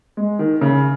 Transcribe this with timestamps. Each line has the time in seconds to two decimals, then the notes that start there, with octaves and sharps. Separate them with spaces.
0.17 G#3
0.39 D#3
0.61 C#3